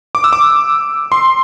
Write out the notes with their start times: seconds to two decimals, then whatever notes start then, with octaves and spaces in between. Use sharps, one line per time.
0.15 D6
0.24 E6
0.33 D6
1.12 C6